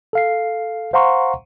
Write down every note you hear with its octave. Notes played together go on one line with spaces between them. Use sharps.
A4 F5 C7
C5 F5 F#5 A#5 C6 C#6